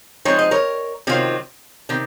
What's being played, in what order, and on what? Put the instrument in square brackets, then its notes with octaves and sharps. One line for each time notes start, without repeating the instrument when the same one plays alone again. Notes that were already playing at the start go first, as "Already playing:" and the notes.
[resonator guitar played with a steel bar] F3 G#3 C4 D#4 C#5
D#5
A#4 C#5
C3 D#3 F#3 C4 F4
C3 D#3